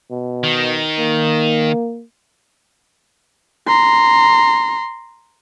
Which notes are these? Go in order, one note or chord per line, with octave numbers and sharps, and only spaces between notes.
B2
D#3
A#3
A#5 C6